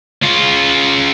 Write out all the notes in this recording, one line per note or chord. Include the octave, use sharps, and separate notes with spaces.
C#3 F4